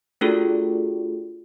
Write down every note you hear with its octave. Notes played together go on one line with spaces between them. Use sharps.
A3 D4 F4 F#4 G#4 A4